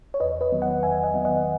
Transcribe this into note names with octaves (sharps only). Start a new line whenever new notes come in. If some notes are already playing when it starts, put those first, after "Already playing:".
C#5
E2 B4 D#5
B4 D#5
D#3 F#3 B3
D#5 F#5
E2 E5 G#5
D#5 F#5
D#3 F#3 B3
D#5 F#5